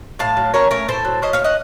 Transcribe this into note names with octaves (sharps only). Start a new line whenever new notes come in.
A2 F5 A5
F#3
C#4 A#4 C#5
A3 A#4 C#5
A2 A4 C5
F#3
C#4 C5 D#5
C#5 F5
A3
D#5 F#5